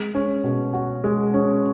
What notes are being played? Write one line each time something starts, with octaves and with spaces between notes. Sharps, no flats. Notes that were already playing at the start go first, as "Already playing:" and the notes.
Already playing: G#3
C#4
B2
F#4
G#3
C#4